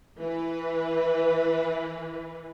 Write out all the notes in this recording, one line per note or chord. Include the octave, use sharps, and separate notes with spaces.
E3 B4